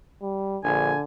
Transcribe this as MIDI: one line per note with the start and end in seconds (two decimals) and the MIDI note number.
0.22 0.59 55
0.64 0.93 34
0.64 1.04 50
0.64 0.99 80